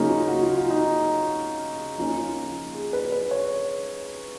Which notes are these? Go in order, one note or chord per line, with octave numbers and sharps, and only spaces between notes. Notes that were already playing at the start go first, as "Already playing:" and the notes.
Already playing: C#3 F#3 A#3 C#4 D#4
F4
F#4
F4
F4
D#4
F3 A#3 C#4 D#4
F4
G#4
B4
B4
C#5